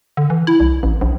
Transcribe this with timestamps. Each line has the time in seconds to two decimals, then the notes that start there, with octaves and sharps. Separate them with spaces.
0.17 D3
0.30 E3
0.47 E4
0.60 C2
0.83 A1
1.01 A#1